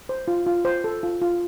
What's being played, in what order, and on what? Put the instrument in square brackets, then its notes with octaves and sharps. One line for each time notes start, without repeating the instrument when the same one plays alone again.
[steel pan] C5
F4
F4
C5
A4
F4
F4